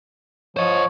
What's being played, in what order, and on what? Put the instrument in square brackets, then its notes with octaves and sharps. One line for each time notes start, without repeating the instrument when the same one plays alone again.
[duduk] F3 [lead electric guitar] C5 D#5 [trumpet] C#5